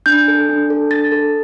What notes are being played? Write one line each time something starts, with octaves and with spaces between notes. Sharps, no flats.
D4 G6
A4
D4
A4
D4 A6
A4